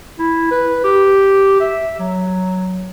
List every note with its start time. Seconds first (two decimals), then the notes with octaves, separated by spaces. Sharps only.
0.19 E4
0.51 B4
0.84 G4
1.60 E5
1.99 F#3